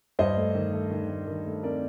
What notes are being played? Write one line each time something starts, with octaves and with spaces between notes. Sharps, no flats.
G2 C5 D#5
A3
D#3
A3
D#3
A3
D#3
A3
C4 A#4 D5